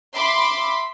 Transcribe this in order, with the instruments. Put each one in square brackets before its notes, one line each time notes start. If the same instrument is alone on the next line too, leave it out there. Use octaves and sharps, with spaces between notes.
[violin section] E5 B5 C6 D6